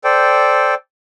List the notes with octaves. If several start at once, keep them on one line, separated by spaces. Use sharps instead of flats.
A4 C5 D5 G5